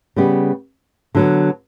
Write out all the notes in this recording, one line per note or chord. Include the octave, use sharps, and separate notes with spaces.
C#3 G3 B3
D3 F#3 B3